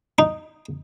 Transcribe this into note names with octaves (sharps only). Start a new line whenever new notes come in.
D#4